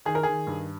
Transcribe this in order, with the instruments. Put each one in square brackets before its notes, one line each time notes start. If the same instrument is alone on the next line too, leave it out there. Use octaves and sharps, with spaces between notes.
[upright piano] D#3 G#4
A#4
D#3 G#4
G2